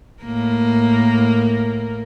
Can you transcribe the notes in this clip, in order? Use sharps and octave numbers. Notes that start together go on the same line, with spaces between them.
A2 A#3 A#4